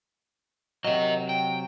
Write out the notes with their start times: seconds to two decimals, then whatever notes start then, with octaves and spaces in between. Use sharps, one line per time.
0.85 C3 F#3 A#4 D#5
1.29 G5